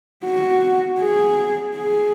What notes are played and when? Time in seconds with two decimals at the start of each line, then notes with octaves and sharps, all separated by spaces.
0.24 F#4
1.00 G#4
1.76 G#4